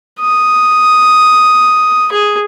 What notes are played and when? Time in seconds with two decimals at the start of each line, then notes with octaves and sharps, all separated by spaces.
0.20 D#6
2.12 G#4